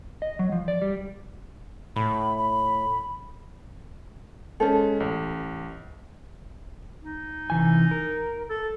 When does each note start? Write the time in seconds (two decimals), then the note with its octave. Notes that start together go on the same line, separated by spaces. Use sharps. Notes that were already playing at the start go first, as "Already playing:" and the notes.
0.22 D#5
0.39 F#3
0.52 F3
0.68 D5
0.82 G3
1.96 A2 B5
2.38 B5
4.60 G#3 C#4 A4 C5
5.00 A1
7.03 D#4
7.50 C3 E3 G#5
7.91 A#4
8.50 A4